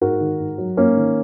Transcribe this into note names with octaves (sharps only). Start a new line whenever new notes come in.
G#2 F#4 A#4
D#3
G#2
F#3
G#2 A#3 C#4
D#3